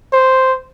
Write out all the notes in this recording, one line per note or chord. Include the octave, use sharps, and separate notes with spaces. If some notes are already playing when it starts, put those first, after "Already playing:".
C5